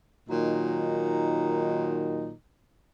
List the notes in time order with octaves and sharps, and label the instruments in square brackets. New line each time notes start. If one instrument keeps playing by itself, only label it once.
[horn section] A#2 D#3 F#3 D#4